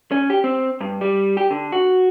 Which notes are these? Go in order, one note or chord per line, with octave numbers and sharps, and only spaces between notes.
C#4
G4
C4
G2
G3
G4
D3
F#4